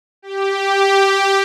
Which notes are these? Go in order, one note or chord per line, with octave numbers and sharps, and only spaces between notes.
G4